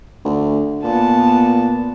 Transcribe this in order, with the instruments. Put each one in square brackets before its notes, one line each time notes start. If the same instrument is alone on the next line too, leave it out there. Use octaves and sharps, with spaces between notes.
[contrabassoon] D2
[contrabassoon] A#2 [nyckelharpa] B3 A5